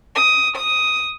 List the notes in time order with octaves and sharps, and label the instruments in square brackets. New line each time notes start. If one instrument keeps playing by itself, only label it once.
[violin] D#6
D#6